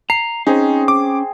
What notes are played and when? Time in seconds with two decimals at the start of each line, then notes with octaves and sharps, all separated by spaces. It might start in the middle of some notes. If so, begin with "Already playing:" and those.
0.10 A#5 C7
0.47 C4 C#4 D#4 G#4
0.88 D6